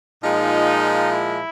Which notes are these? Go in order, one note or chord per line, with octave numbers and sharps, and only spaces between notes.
A#2 F3 G#3 D#4
E4